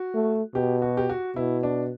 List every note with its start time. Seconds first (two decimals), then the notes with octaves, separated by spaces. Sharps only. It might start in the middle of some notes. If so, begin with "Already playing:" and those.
Already playing: F#4
0.14 A3
0.55 B2 G4
0.82 F#4
0.97 G4
1.09 F#4
1.36 B2 E4
1.63 D4